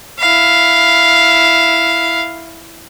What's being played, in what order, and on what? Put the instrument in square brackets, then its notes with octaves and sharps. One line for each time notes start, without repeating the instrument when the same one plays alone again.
[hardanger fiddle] E4 F5